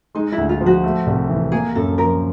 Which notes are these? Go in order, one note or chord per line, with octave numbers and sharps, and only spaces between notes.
G#3 D#4
E4
D2
F4
F3
F#4
A3
C2
E3
A#3 G#4
F#2 A4
F3 A#4